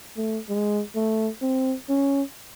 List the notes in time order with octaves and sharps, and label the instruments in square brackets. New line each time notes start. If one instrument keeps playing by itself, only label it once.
[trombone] A3
G#3
A3
C4
C#4